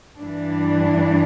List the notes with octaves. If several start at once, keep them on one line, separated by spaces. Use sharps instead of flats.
G2 E3 D4